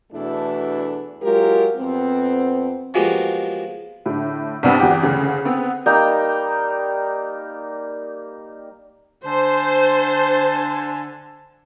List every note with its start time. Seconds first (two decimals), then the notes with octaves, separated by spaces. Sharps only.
0.13 E2 B2 A3 D4 E4
1.22 F#3 G#3 F4 G4 A#4
1.77 F2 B3 C4
2.94 F3 F#3 G#3 A#3 B3 G4
4.06 A2 D3
4.63 C2 G2 G3 B3 C4
4.80 E2 F#4 G4
5.03 D2 C#3
5.45 B3 C4
5.86 G3 A#3 D#4 G5
9.26 D3 C5 G#5 A5